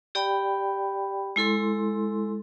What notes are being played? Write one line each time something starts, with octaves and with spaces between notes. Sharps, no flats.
G4 D5 G5 B5
G#3 E4 A4 C6